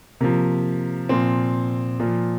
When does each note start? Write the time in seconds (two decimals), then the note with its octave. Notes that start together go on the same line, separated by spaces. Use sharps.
0.21 C3 F3 A#3
1.09 A#2 F3 C4
2.00 A#2 F3